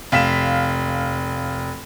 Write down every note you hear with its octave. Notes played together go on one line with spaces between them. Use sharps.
F1 F5 B6 E7